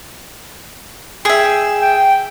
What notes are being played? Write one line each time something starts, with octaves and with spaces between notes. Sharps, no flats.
G#4 E5 G5
G5